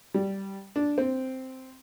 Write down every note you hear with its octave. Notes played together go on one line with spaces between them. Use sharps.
G3
D4
C4